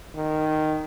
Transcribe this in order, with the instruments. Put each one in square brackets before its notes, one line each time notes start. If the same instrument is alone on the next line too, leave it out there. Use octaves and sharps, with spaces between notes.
[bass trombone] D#3